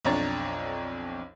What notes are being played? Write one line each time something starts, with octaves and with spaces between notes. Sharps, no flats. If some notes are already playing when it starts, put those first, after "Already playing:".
B1 F2 D4 C#5 A#5 A6